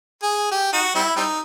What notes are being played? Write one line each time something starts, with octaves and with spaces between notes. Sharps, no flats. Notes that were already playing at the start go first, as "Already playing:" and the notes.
G#4
G4
D#4 F#4
G3 C4 E4
G3 C4 D#4